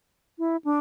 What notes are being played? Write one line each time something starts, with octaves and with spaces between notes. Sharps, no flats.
E4
D4